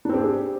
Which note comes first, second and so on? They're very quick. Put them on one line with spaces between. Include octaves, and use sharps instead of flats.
D4 C4 G4 G#4